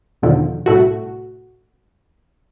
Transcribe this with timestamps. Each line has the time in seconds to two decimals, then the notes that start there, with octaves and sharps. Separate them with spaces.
0.22 E2 B2 D3 D#3 F3
0.66 C2 A2 A3 F#4